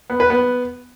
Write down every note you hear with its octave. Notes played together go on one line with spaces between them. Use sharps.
B3
B4
B3